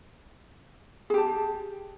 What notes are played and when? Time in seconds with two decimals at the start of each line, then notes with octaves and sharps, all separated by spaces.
1.10 G#4
1.14 G4
1.18 A5